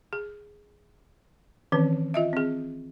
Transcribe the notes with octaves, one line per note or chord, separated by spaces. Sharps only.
G#4
D#3 E3 C4 C#4 B4
F4 D#5 E5
C4 G#4